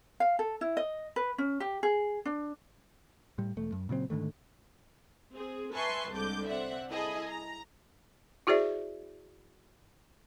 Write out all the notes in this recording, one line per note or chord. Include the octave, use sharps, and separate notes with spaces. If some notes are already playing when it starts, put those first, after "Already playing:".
F5
A4
E4
D#5
B4
C#4
G4
G#4
D4
A2 G3
E1 A3
F#2
A#2 C#3 F#3 C4
G#2 D3 D#3 A3
C4 G#4
B4 E5 G#5 A5 C6 C#6
C2 D3 G#3 D6 G6
C4 D5 E5 F#5
E4 G#4 A4 D#5 B5
A#5
E4 F#4 G#4 C5 D5 E5